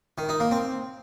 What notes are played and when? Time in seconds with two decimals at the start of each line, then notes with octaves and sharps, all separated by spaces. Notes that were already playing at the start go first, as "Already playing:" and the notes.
0.18 D#3
0.29 D#4
0.40 A#3
0.51 C4